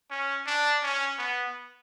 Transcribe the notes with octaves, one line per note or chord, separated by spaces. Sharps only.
C#4
D4
C#4
B3